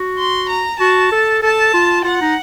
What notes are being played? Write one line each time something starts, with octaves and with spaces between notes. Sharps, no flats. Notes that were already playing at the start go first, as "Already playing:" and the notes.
Already playing: F#4
C6
A#5
F#4 A5
A4
A4 A5
F4
F4 F#5
D#4